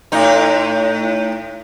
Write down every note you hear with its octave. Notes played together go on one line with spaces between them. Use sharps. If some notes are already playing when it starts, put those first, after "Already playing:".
A2 D#4